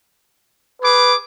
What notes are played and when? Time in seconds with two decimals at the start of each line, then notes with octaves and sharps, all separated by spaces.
0.82 G#4 B4 D6